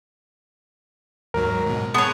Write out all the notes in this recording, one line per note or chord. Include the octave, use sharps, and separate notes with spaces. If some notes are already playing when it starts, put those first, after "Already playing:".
D#2 G#2 F#3 A#4
G#2 B2
B3 G#4 C#5 A5 C6